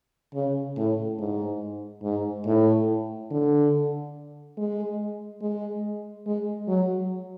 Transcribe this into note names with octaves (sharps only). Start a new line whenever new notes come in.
C#3
A2
G#2
G#2
A2
D3
G#3
G#3
G#3
F#3